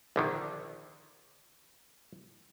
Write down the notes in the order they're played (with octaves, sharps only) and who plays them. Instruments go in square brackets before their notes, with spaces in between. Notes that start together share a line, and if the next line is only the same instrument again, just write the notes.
[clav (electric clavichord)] A#1 D3 D#3